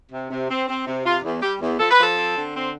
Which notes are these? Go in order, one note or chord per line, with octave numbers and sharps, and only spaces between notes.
C3
C3
C4
C4
C3
C3 F4
E2
G3 G4
E2
F3 A4
B4
F3 A4
C4
D3
C4